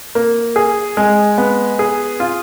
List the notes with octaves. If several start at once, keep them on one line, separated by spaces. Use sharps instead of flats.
A#3
G#4
G#3
B3
G#4
F4